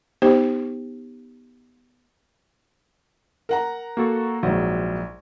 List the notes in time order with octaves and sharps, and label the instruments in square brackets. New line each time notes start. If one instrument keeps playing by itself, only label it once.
[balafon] B3 D#4 G4 C5
[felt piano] A#4 F#5 A#5
[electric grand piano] A#3 F#4 A4
[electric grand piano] A#1 G#2 [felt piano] F#3